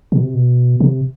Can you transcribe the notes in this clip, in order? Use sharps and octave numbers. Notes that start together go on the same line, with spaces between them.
B2
C3
B2
C3